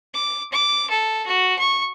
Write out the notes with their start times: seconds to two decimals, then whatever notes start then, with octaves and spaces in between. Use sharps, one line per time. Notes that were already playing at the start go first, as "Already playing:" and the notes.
0.14 D6
0.52 D6
0.90 A4
1.27 F#4
1.58 C#6